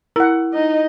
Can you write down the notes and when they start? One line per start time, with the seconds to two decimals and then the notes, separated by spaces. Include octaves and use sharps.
0.16 E4 A#4 F#5
0.53 D#4 D#5